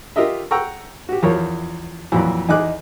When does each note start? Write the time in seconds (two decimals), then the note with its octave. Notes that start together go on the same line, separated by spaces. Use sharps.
0.16 F4 G4 A#4 D#5 E5
0.51 F#5 G5 A#5 C#6 E6
1.09 F#4 G4
1.23 E2 F3 A#4 C#5
2.12 F2 A#2 E3 F#3
2.49 E2 D#4 G#5 D6 F#6